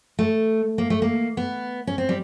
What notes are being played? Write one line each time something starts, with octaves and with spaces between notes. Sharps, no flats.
A3
A#3
A3
A#3
B3
C#4
C4
G3